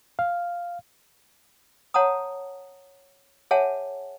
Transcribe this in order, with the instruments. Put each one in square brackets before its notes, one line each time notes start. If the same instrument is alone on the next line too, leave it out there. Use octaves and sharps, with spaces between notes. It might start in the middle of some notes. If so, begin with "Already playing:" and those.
[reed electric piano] F5
[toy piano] C#5 F#5 A5 A#5 D#6
G#4 C#5 E5 F#5 G#5 A5